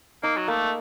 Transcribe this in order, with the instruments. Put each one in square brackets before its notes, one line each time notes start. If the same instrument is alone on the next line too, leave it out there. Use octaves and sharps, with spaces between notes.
[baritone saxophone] A#3 [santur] D#4
[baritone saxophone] F#3
[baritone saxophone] A3 [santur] A#3